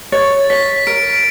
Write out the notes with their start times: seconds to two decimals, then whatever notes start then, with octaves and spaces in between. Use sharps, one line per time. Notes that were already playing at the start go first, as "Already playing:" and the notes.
0.12 C#5 A6
0.50 C#5 B6
0.87 A#4 D7